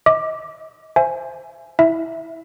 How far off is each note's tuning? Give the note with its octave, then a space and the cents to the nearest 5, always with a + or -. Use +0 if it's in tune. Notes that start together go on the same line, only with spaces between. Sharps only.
D#5 +30 D6 +10
C5 +0 E5 +25 G#5 +10
E4 -15 E5 +0